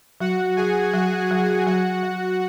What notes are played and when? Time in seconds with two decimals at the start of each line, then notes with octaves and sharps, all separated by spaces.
0.20 F#3 F#4 F#5
0.56 F#3 G#4 G#5
0.93 F#3 F#4 F#5
1.31 F#3
1.66 F#3 F#4 F#5
2.03 F#3